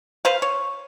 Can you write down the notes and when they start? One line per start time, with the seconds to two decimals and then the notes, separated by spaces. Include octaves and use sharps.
0.25 B4 C5 F5
0.42 C#5